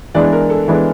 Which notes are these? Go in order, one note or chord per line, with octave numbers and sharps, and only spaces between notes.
E3 G#3 B3 D4 D5
A#4
A4
E3 G#3 B3 D4